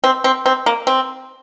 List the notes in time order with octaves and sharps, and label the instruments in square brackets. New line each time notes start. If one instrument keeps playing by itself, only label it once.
[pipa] C4
C4
C4
A#3
C4